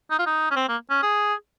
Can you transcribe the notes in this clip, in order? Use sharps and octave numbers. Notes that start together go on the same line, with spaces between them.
D#4
F4
D#4
C#4
C4
A#3
C#4
G#4